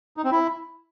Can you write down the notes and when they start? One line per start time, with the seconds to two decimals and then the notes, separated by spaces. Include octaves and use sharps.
0.17 D#4
0.24 C4
0.31 E4